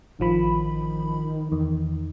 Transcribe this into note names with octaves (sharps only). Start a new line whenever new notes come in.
A1 D#3 F3 B5
E2 D#3